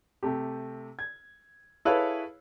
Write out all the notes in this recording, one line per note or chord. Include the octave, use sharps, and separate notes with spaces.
C3 A3 G4
G#6
E4 G#4 A4 B4 C#5 F5